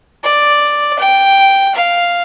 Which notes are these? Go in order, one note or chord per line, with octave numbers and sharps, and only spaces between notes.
D5
G5
F5